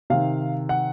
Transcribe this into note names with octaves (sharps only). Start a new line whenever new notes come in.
C3 D#3 F5
F#5